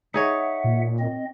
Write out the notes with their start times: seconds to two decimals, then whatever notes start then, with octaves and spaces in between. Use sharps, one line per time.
0.14 D#4 G#4 C#5 E5 F#5
0.64 A#2
0.99 C4 D#5